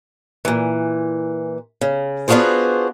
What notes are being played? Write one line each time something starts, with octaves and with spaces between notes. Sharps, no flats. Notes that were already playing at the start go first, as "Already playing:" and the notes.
A#2 E3
C#3
B3 D4 F4 F#4 G#4 C5